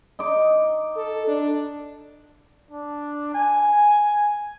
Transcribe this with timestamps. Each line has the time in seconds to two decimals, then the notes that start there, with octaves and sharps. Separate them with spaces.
0.19 D#4 D6
0.97 A4
1.28 D4
2.71 D4
3.35 G#5